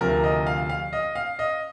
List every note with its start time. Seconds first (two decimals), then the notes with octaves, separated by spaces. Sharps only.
0.01 D2 C3 F3 A#4
0.24 D#5
0.47 F5
0.69 F5
0.93 D#5
1.15 F5
1.39 D#5